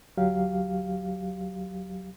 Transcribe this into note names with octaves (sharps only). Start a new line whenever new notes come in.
D2 F#3 G4 F5